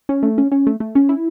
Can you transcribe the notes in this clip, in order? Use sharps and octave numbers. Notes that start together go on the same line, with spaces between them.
C#4
A3
C#4
C#4
A3
A3
C#4
E4